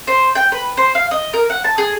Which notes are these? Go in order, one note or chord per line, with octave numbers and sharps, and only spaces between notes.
C5
G5
B4
C5
F5
D#5
A#4
F#5
A5
G#4